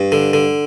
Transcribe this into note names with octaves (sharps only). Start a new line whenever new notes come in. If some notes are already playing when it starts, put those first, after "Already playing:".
Already playing: G2
D3
D3